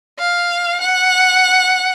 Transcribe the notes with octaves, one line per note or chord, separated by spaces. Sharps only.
F5
F#5